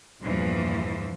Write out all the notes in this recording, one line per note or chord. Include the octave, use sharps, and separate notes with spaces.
E2 G2 A#2 E3 F3